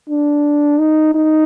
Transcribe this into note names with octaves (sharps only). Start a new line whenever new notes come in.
D4
D#4
D#4